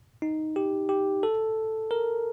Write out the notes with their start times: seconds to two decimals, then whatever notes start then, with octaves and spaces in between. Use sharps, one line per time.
0.22 D#4
0.56 G4
0.89 G4
1.23 A4
1.91 A#4